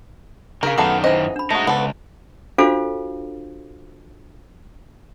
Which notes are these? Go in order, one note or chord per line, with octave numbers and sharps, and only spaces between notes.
C#3 D4 G#4 A#4 F5
F#2 D#3 F#3 A3 B3 A4 F#5 D6
E3 C#4 C5 D#5
D4 B5
G#3 A3 D#4 F#4
C#2 B3 A4
D4 F4 F#4 A4 C5 F5